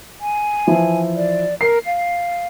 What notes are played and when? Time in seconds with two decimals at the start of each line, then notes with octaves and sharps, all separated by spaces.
0.21 G#5
0.67 E3 F3 E4
1.17 D5
1.61 A#4 C7
1.86 F5